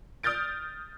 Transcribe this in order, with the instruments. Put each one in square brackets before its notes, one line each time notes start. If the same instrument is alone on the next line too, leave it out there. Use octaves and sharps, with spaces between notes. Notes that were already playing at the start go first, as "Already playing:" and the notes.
[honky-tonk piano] D#6 F6 G6 A6 D7